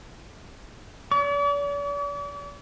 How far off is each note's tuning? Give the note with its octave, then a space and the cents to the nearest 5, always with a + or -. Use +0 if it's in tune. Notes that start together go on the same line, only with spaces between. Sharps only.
D5 -45 D6 -45